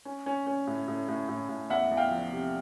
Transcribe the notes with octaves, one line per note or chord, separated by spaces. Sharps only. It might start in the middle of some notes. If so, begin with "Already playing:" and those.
C#4
C#4
C#4
A2
A2
A2
A2
A2
E2 E5 F#5
E2
F5 G5
F3
C3